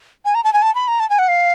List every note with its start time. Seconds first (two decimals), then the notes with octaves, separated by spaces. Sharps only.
0.25 G#5
0.35 A#5
0.44 A5
0.53 G#5
0.62 A5
0.75 B5
0.88 A#5
1.00 A5
1.10 G#5
1.19 F#5
1.28 F5